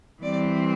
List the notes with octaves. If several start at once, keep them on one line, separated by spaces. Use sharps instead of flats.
E3 G3 C4 D5